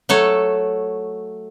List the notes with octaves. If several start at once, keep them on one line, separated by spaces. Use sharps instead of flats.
F#3 A3 A4 C#5